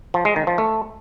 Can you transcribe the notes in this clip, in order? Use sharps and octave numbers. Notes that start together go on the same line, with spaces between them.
F3
G#3
D#3
F3
A3